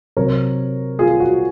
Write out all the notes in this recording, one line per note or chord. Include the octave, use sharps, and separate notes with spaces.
C3 F#3 C4 A#4 C#5
F4 G#4
F#4